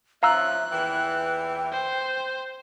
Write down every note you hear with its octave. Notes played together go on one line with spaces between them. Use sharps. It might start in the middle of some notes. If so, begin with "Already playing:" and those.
F3 C#4 E5 F5 A#5 E6 F#6
E2 A#2 E3 G5
C5